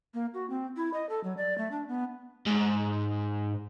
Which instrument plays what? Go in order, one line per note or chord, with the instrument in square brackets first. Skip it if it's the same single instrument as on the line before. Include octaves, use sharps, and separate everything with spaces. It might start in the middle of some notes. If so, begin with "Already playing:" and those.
[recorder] A#3
F#4
C4
E4
D#5
A4
F#3
D5
A3
D4
B3
[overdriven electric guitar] G#2